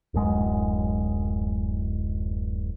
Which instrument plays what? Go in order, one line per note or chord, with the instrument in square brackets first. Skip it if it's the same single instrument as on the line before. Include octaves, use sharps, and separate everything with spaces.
[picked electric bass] D1 F#2 G#3